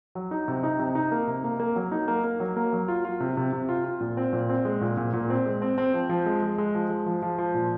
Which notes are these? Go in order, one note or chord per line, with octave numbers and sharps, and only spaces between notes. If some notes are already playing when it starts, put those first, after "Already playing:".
F#3
D#4
C3
D#4
C3
D#4
A#3
C3
A#3
A#3
F#3
D#4
A#3
A#3
F#3
A#3
F#3
F4
F4
C3
C3
C3
F4
F4
A#2
C4
A#2
C4
G#3
A#2
A#2
A#2
C4
G#3
C4
C4
F3
F3
G#3
G#3
G#3
F3
G#3
F3
F3
F3
A#2